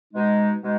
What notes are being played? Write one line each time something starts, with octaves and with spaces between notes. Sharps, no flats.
B2 G#3 D#4
B2 G#3 D#4